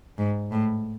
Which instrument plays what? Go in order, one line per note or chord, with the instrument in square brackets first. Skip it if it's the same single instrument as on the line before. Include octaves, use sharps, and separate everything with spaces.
[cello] G#2
A2